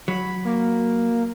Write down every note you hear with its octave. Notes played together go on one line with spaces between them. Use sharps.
F#3 B5
A#3